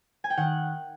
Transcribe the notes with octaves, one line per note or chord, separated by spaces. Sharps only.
G#5
G5
D#3 F#5